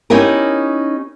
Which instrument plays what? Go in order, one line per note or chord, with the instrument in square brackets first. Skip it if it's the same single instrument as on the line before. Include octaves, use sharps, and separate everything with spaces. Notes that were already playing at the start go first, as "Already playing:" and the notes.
[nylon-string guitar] C#4 D#4 E4 G4 A#4